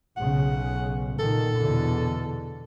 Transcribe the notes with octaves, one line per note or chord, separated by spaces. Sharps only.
B1 C#3 F#5
A#2 D#3 A4
E2 B2 D3